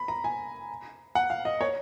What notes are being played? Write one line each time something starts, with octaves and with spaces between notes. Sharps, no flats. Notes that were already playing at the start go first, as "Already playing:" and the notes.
Already playing: B5
A#5
G#5
F#5
F5
D#5
C#5